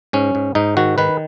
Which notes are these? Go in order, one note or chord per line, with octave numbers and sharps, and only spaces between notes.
G#2 C#4
G#2
G#2 D#4
D#3 F#4
D#3 B4